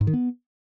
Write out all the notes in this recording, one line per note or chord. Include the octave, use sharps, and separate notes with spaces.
G#2
D#3
B3